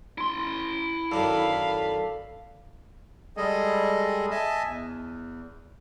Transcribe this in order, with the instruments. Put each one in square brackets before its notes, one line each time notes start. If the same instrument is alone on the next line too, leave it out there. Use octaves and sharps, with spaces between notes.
[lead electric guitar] E4 C6
[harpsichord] F#2 A2 D#3 [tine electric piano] A4 D5 A5 [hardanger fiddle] F5 B5
[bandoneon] G3 G#3 G#4 A4 D#5
D#5 E5 G#5 A5
E2